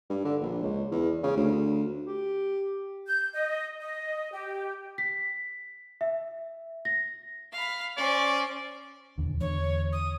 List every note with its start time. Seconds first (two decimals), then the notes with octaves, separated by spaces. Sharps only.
0.10 G2
0.25 D3
0.41 A#1
0.62 C#2
0.91 E2
1.23 C#3
1.36 D2
2.07 G4
3.07 G6
3.34 D#5
3.81 D#5
4.33 G4
4.98 B6
6.01 E5
6.85 A#6
7.52 F5 B5
7.97 C#4 C5 D5
9.18 D#1 E2 D3
9.40 E2 D3 C#5
9.92 D#6